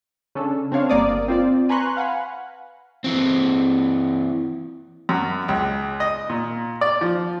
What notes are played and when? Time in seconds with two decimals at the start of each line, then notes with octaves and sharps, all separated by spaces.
0.35 C#3 C#4 D4 A4
0.72 C4 D4 C#5 F5
0.89 G1 A#3 D5 D#6
1.28 C4 F4 D5
1.69 B4 G#5 A#5 C6 C#6 F#6
1.97 F5 F#5 G#5 B5
3.04 E3 C4
5.09 F#2
5.48 C#2
6.00 D#5
6.30 A#2
6.81 D5
7.01 F3